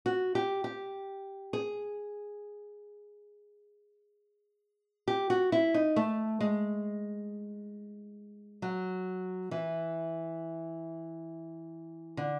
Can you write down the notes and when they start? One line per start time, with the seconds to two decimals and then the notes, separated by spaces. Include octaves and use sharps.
0.06 F#4
0.35 G4
0.64 G4
1.53 G#4
5.08 G4
5.30 F#4
5.52 E4
5.74 D#4
5.96 A3
6.41 G#3
8.62 F#3
9.51 E3
12.17 D3